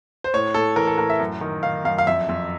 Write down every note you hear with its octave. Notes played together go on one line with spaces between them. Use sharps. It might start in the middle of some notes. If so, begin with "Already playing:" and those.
C5
A2 C#5
A2 A4
E3 A#4
A4
A2 A#4
E5
F#2
D#3
D#3 F5
F#2 F5
F5
F2 E5
F2